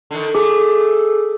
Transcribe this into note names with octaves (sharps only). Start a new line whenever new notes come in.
D3 D#3
A3 G#4 D6